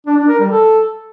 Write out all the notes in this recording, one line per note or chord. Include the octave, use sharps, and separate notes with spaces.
D4
D4
A#4
G3
A4